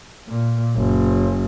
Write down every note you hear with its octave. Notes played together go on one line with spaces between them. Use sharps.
A#2
F#1